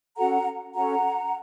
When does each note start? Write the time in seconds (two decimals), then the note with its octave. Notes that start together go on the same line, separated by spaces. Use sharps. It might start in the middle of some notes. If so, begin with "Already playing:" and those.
0.17 C#4 F#4 A4 F#5 A#5
0.75 C#4 F#4 A4 F#5 A#5